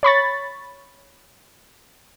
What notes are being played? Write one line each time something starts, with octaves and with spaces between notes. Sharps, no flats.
C#5 B5 C#6 A6